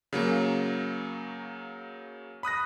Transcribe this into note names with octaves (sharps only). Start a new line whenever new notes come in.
C#3 F#3 A#3
B5 D#6 F#6 A#6